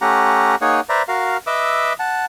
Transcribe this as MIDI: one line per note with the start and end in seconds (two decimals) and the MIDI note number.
0.01 0.55 57
0.01 0.55 61
0.01 0.55 67
0.01 0.55 78
0.01 0.55 82
0.61 0.80 58
0.61 0.80 63
0.61 0.80 68
0.61 0.80 73
0.61 0.80 78
0.89 1.03 71
0.89 1.03 72
0.89 1.03 74
0.89 1.03 76
0.89 1.03 82
1.08 1.37 66
1.08 1.37 70
1.08 1.37 77
1.47 1.93 71
1.47 1.93 75
1.47 1.93 76
1.47 1.93 86
1.47 1.93 88
2.00 2.25 78
2.00 2.25 81